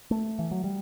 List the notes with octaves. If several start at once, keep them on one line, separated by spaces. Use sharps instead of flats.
A3
E3
F#3
G3